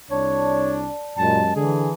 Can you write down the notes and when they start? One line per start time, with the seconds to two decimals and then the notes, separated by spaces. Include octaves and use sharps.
0.11 C2 D4 C#5 D5 A5
1.18 F#2 A#2 G#3 G4 D#5 A5
1.56 D3 E3 G#4 A5